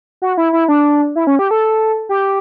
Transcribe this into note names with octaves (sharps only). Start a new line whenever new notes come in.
F#4
E4
E4
D4
E4
C#4
G4
A4
G4